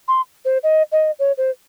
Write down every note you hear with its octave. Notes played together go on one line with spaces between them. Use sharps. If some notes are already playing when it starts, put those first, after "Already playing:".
C6
C5
D#5
D#5
C#5
C5